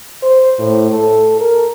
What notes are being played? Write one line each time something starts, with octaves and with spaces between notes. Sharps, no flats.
C5
A2
A4
A#4